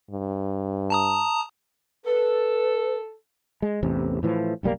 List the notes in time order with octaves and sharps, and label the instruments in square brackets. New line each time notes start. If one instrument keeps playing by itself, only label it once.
[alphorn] G2
[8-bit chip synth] A5 A#5 D#6
[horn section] A4 [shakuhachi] B4
[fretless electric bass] G#3
A1 E2 C3
A2 E3 F3
F#1 B1 G3 A#3